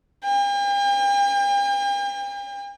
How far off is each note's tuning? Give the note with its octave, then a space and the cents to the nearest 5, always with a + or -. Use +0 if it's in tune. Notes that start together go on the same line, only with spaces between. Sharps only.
G5 +45